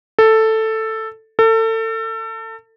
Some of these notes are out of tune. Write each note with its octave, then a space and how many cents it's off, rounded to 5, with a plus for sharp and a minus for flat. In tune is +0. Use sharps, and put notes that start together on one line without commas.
A4 +5
A4 +30